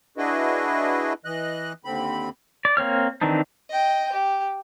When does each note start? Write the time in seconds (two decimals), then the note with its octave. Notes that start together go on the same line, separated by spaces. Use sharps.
0.17 D4 E4 F#4 G#4 B4 D#5
1.25 E3 D#5 F#6
1.85 D#2 D3 C4 B5
2.65 D5
2.77 A#3 C4 C#5 F6
3.21 D#3 E3 C4 D4 D#4
3.70 D#5 G5
4.12 G4